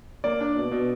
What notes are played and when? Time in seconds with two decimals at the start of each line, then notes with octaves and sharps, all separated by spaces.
0.24 A#3 D5
0.41 D4
0.56 B2
0.71 B2